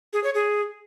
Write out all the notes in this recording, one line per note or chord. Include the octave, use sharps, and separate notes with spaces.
G#4
C#5
G#4